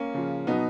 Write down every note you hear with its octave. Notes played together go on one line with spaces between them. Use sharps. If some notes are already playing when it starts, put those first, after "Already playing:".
Already playing: A#3 C#4
C#3 F3
B2 F#3 B3 D#4